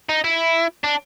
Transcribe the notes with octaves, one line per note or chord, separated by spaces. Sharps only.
D#4
E4
D4